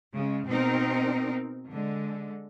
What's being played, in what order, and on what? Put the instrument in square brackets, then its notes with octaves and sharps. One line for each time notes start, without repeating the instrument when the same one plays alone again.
[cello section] C#3 G#3
B2 C4 D#4 A#4
D3 G#3